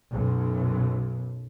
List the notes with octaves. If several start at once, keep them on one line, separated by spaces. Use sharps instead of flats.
B1 F#2